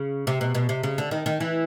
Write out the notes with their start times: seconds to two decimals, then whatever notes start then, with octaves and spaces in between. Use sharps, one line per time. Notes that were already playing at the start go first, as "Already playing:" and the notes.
Already playing: C#3
0.27 C3
0.41 B2
0.55 B2
0.69 C3
0.83 C#3
0.98 D3
1.11 D#3
1.26 D#3
1.40 E3